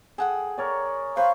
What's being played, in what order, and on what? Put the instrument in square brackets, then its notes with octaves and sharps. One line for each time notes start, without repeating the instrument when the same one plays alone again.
[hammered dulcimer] G#4 [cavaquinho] A4 F#5 G5
[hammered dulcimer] A#4 C#5 D5
[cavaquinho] B4 [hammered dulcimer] C5 C#6 [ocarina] F5